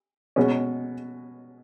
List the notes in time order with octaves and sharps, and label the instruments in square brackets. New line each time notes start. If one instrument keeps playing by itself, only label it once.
[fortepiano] B2 G#3 C#4